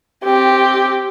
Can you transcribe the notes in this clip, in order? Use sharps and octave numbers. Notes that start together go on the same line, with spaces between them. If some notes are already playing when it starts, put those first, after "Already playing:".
C4 G4